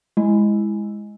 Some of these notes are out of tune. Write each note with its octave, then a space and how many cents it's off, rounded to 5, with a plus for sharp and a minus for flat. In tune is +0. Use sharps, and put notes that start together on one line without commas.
G#3 +0 E4 +0